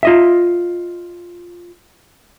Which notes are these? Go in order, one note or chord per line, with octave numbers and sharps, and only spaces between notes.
F4 D#5 E5